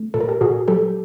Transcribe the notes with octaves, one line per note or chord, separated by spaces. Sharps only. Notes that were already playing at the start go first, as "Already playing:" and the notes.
Already playing: A3
A#2 A4
A#4
G4 A4
A#2 F#4 G#4
F#3 G4 A4